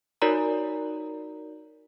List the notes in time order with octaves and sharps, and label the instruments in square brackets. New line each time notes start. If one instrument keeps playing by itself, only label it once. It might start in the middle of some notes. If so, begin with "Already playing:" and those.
[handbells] D#4 F#4 A#4 C#5 D5 A#5